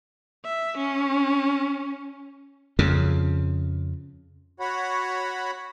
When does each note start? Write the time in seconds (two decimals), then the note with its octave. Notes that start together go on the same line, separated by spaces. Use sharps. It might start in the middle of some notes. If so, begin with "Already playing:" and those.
0.44 E5
0.77 C#4
2.79 F2 C#3
4.60 F#4 C#5 F#5 B5